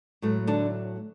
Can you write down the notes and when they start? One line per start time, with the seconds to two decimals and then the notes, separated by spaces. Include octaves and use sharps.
0.22 A2 F#3 A3
0.47 D3 D4